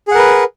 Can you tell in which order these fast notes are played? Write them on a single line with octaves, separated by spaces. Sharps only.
G#4 F#5 A#4 B4